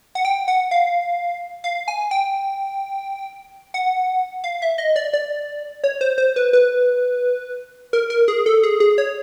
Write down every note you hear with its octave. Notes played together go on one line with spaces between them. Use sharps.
F#5
G5
F#5
F5
F5
G#5
G5
F#5
F5
E5
D#5
D5
D5
C#5
C5
C5
B4
B4
A#4
A#4
G#4
A4
G#4
G#4
C#5